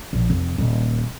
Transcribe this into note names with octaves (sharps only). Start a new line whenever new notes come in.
A#1
F1
D#1 A#3